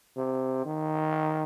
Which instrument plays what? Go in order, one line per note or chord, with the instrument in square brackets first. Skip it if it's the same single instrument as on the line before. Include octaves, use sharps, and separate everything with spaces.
[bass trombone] C3
D#3